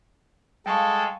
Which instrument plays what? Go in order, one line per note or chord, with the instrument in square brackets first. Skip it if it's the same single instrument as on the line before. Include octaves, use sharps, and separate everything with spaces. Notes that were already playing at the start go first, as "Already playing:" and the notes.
[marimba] G3 F5 [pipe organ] G#3 A4 [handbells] G5 A5 C#6